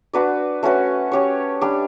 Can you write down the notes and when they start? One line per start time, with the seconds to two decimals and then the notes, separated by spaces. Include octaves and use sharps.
0.13 D4 F#4 B4 D5
0.63 A3 C#4 F#4 B4
1.12 C#4 G4 C#5
1.61 G3 D4 G4